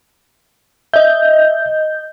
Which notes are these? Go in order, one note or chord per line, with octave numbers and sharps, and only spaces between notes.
D#5 E5 G6